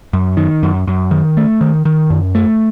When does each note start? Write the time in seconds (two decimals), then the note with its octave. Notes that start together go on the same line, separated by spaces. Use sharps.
0.13 F#2
0.37 D#3
0.63 F#2
0.87 F#2
1.11 D#3
1.37 A3
1.61 D#3
1.85 D#3
2.10 F#2
2.35 A3